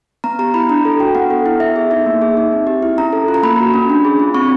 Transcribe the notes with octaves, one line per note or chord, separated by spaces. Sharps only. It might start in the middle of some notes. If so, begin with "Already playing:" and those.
B3 A#5
G4 A#5
E4 B5
D4 A#5
A4
F#4 G5
B3 F#5
A4
E4
B3 E5
G#4
D#4 E5
A#3
G#4
D#4
C4
G4
E4
C#4 A#5
A4
F4
A#5
A#3 B5
F#4
C#4
D4
G#4
F4
C4 C#6